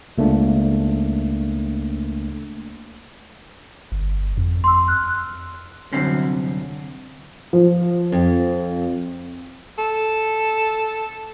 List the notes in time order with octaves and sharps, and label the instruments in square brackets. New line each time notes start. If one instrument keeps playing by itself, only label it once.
[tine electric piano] C#2 A3 A#3 D4
[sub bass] G1
F2
[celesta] C6 E6
F6 F#6
[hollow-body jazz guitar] C2 F#2 D3 C4 C#4
[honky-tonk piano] F3
[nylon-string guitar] F2
[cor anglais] A4